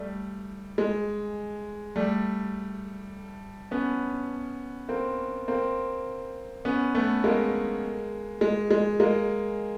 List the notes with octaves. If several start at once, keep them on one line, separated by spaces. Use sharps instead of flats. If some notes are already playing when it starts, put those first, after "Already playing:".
Already playing: G3 A3
G#3
G3 A3
B3 C#4
A#3 C4
A#3 C4
B3 C#4
A3 B3
G#3 A#3
G#3
G#3
G#3 A#3